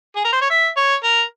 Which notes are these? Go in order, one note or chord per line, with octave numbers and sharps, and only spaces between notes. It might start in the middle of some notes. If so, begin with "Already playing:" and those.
G#4
A#4
C5
C#5
E5
C#5
A#4